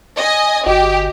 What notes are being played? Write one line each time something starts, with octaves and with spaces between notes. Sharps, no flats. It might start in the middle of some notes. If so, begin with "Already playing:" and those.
D#5 G#5
G1 F#4 G4 D#5